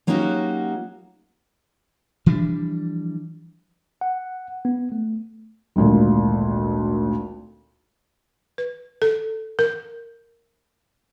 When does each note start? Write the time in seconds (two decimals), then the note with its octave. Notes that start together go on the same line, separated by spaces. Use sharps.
0.07 F#3 A#3 C#4 D#4 F#4 G4
2.26 E3 F3 G3 D4
4.01 F#5
4.65 B3
4.92 A3
5.76 G#1 D2 A#2
8.58 B4
9.02 A4
9.59 A#4